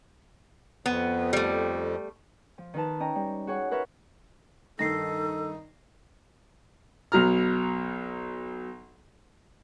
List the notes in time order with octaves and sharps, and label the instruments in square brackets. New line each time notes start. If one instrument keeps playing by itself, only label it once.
[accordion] F2 [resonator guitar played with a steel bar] B3
[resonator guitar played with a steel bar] G3 A3
[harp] F3
D#3 D#4 B4 A5
C#4 D#5 G5 A#5
G3
F#4 G#4 C#5 F#5
A#4 B4 C#5 E5
[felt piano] G2 D#3 [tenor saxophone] D#4 [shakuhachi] A4 [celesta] A#6 C7
[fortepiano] B1 F#3 A#5 F6